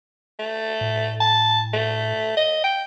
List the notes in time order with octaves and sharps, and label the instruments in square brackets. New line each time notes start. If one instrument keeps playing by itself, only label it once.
[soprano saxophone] A3
[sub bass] A2
[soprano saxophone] A5
A3
D#5
G5